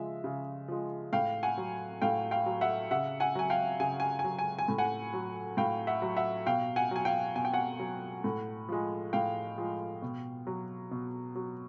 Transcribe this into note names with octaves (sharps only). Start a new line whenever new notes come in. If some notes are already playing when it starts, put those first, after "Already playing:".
Already playing: C#3 F3 G#3 E5
C#3
F3 G#3
A2 F5 G5
F#5 G#5
F#3
A2 F5 G5
F5 G5
F#3
E5 F#5
C#3 E5 F#5
F#5 G#5
F#3 G#5
F5 G5
C#3 G#5
G#5
G#5
F#3
G#5
G#5
A2
F#5 G#5
F#3
A2 F5 G5
E5 F#5
F#3
E5 F#5
B2 F5 G5
F#5 G#5
F#3 G#5
F5 G5
B2 G#5
G5
F#5 G#5
F#3
A2
F3 G#3
A2 F5 G5
F3 G#3
B2
F#3
B2
F#3